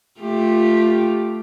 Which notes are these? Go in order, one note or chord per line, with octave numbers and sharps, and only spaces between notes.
A3 F4 G4